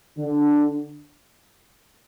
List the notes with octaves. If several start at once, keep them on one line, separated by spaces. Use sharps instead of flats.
D3 D4